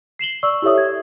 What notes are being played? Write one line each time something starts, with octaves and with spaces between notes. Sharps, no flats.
C7 E7 F#7 G7
D5 C#6 E6
E4 G4 A4 C#5 E5 D#6
G#6